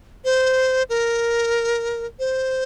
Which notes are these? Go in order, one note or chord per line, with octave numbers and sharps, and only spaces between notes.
C5
A#4
C5